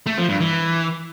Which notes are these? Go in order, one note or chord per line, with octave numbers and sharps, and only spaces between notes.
A3
F3
G2
E3